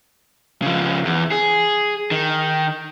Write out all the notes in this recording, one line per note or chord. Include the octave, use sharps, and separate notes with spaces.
C#3 F3
E2
G#4
D#3